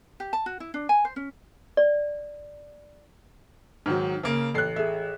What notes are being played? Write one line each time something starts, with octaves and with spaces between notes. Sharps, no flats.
G4
A5
F#4
E4
D4
G#5
C5
C#4
D5
G#2 D#3 F#3 F6
C#3 A#3
A1 A4 F#6 C7
G#4 A4 E5